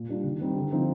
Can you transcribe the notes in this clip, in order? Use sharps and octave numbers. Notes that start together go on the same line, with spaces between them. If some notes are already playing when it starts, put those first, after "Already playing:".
Already playing: A#2
G3 D4 F4
D#3
G3 C4 D#4
D3
F3 C4 D#4